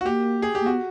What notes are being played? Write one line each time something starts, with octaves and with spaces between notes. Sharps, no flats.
F#4
A#3 G4
G#4
G4
A#3
B3 F#4